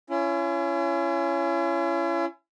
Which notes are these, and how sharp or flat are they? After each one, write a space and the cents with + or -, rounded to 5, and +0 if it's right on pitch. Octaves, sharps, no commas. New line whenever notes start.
C#4 +5 E4 +45